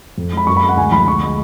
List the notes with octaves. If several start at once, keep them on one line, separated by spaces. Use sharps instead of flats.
F2
G#3 B5
F#2 C#6
B5
G#3
F#5
D2 G#5
F3 B5
D2 C#6
G#3